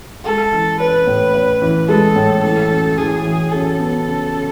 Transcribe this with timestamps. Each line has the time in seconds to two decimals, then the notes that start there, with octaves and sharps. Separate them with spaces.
0.25 G#3 A4
0.52 E3
0.80 C#4 B4
1.07 A2
1.34 C#4
1.62 E3
1.88 G#3 A4
2.15 A2
2.43 E3 A4
2.70 F#2
2.98 E3 G#4
3.25 E3
3.52 F#2 A4
3.79 B3
4.07 C#3
4.33 C#3